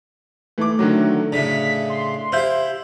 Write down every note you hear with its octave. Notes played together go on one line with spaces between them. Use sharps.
E3 A3 D6
D3 D#3 F#3
A2 C#3 D4 B6
C6
E4 G4 C5 F5 G6